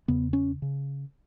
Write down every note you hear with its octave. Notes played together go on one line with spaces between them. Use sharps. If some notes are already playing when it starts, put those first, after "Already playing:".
E2 C#3 B3
C#4
C#3